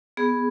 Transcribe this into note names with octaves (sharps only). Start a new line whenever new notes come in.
B3 G#4